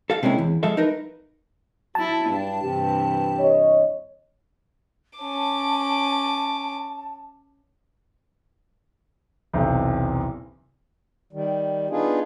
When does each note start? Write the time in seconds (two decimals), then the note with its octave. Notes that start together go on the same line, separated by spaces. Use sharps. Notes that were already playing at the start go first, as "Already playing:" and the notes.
0.10 A4 F5
0.23 C3 G#3 A#3 C#4 E4
0.38 E2
0.63 F3 G#3 A4 E5 F5
0.77 D#4 A#4 B4
1.95 F#3 E4 A5
2.29 G2 D4
2.64 G2 C3 E3 G4
3.40 C#5 D#5
5.19 C#4 A5 D6
9.53 B1 E2 C3
11.33 D#3 G3
11.90 B3 D4 D#4 F4 G#4